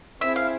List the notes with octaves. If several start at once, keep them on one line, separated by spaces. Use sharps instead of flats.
C4 E4 G#4 C5 E5
F5